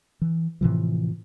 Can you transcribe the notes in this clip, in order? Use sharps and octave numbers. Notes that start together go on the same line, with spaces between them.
E3
A2 C3 E3 F3